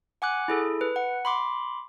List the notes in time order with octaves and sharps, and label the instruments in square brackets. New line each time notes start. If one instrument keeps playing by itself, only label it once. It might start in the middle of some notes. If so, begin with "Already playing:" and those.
[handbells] F#5 G#5 D6 F#6
E4 G#4 A4
B4
F#5
B5 C6 D6